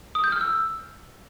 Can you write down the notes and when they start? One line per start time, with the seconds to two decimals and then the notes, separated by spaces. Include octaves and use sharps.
0.15 D#6
0.24 G6
0.32 F6
0.41 E6